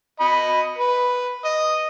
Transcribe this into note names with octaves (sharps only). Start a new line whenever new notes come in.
D#5 B5
B4
D#5